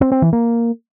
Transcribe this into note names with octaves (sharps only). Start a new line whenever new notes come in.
C4
C4
E3
A#3